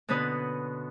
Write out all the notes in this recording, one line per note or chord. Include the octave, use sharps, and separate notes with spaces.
B2 D3 B3 C#4 B4 D#6